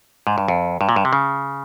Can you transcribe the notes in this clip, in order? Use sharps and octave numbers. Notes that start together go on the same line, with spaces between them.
G#2
G2
F2
G2
A#2
G2
C3
C#3